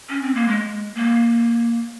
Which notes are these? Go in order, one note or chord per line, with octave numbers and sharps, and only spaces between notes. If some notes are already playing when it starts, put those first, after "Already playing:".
C#4
C4
A#3
G#3
A#3